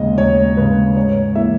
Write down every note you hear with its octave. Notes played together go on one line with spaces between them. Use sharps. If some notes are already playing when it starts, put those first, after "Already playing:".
Already playing: D#2 C#3 G#3 D#5
D#2 C#5
C#3 G#3 B4
G#2 C#5
E3 A#3 E5